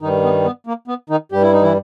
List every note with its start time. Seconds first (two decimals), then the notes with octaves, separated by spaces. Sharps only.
0.01 G2 D#3 D#4
0.05 G3
0.23 B3
0.45 B3
0.67 A#3
0.88 B3
1.10 D#3 D#4
1.32 G2 G3 G4
1.42 E4
1.53 D#4
1.62 E3 E4